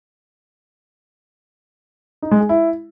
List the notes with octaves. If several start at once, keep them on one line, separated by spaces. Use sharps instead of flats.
D#4
G#3
G#4
E4